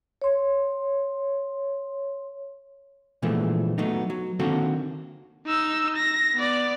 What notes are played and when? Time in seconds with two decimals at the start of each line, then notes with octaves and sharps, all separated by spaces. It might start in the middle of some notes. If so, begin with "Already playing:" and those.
0.22 C#5 C6
3.22 A#2 D3 E3 F3 G#3 A3
3.78 F#3 A3 B3 D#4
4.10 F#3
4.39 D3 D#3 A#3 C4 F#4 A4
5.47 D#4 E6
5.96 A#6
6.35 B3 D5